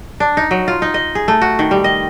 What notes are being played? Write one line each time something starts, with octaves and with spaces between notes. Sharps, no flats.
D4
D#4
F#3
F4
D#4
D#5
G#4
A3
F#4
D#3
G3
D#5